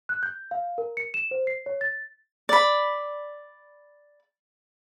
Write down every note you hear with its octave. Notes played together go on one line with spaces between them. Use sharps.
F#6
G6
F5
A#4
C#7
E7
C5
C7
C#5
A6
D5 B5